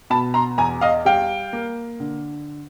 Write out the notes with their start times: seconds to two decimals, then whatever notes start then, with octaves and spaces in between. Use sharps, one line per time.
0.10 B2 A5 B5
0.34 A#5 C6
0.58 E2 G#5 A#5
0.81 D#5 F5
1.05 G3 F5 G5
1.53 A#3
2.00 D3